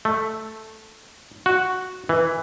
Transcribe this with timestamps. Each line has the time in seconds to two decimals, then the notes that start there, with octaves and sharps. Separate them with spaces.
0.05 A3
1.46 F#4
2.09 E3